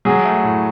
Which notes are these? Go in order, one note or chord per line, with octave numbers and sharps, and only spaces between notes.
F#3 G#4
A3
A2